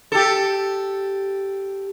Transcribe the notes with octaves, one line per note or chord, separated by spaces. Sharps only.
G4 A4